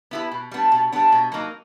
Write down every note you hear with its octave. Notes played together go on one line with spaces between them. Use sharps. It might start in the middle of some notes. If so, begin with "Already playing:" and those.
B3 E4 G4 B4
B2
G3 B3 D4
B2
G3 B3 D4
B2
F#3 A#3 D#4